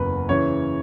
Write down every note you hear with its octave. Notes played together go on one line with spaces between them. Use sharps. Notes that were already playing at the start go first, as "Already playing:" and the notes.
Already playing: F#1 E2 C#3 F#3 B4
C#3 E3 C#5